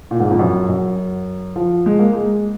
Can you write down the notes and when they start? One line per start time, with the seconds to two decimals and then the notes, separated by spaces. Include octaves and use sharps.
0.11 A#2
0.20 G#2
0.30 F2
0.39 F#2
0.69 F#2
1.56 F3
1.86 G#3
1.99 A#3
2.13 G#3